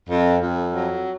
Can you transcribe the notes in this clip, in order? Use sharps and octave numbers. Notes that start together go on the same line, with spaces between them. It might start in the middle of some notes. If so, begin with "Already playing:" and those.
F2
F2
F#3